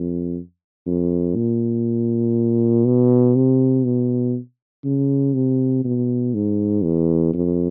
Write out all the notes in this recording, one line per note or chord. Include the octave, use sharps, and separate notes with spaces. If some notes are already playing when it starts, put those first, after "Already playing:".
Already playing: F2
F2
A#2
B2
C3
B2
C#3
C3
B2
G#2
E2
F2